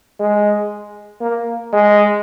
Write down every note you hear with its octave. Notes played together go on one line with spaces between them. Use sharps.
G#3
A#3
G#3